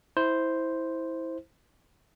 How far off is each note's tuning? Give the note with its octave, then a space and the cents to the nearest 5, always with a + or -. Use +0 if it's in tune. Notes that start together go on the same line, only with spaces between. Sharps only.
E4 -15 C5 +0